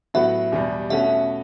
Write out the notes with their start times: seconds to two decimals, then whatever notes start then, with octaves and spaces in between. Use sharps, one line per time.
0.14 A2 F#3 B3 F#4 E5
0.52 E2 B2 G3
0.90 B2 A3 C#4 F#4 E5